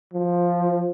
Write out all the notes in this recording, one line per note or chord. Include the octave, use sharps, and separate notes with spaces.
F3